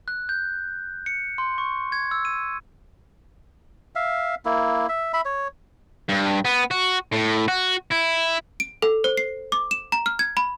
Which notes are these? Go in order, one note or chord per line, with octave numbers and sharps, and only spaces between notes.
F#6
G6
C#7
C6
C#6
G#6
E6
D#7
E5 F5
A#3 E4
E5
E5 B5
C#5
G2
B3
F#4
A2
F#4
E4
D7
A4
C5
C7
D6
E7
A#5
F6
G#6
B5